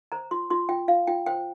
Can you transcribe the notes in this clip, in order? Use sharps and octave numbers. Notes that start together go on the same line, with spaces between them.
C5 A#5
F4 C6
F4 C6
F4 G5
F4 F5
F4 G5
C5 G5